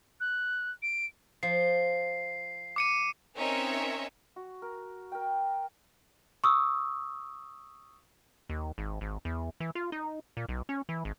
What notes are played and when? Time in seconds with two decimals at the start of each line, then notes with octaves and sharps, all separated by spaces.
0.20 F#6
0.82 D7
1.43 F3 C7
2.76 D6 C#7 D#7
3.38 C4 C#4 D#4 A#4 C#5 E5
4.36 F#4
4.62 A#4
5.12 A#4 G5
6.44 C#6 D#6 E6
8.50 D#2
8.78 G#1
9.01 G#1
9.25 E2
9.60 E3
9.75 F4
9.92 D#4
10.37 A#2
10.49 B1
10.69 C#4
10.89 E3
11.05 G#1